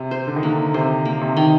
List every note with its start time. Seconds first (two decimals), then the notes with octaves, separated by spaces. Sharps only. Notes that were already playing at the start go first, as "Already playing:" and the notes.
Already playing: C3
0.11 C5
0.27 D3
0.36 D#3
0.43 D3 A#3
0.74 C3 C5
1.05 A#3
1.21 C3
1.37 D#3